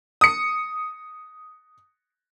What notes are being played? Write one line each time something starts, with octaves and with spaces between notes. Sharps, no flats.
D#6 C#7